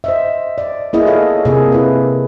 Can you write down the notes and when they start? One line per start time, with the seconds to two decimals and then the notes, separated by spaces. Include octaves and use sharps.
0.04 C5 D#5 E5
0.58 D5
0.93 A#3 B3 E4 G#4 D#5
1.06 F4 A4 C#5 F5
1.45 C3 A#3 C4 G#4
1.72 E4 B4